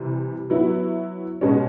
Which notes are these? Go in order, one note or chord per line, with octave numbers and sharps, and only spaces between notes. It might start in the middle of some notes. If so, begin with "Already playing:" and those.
Already playing: C3 E3 G3
F#3 B3 E4
B2 G#3 C#4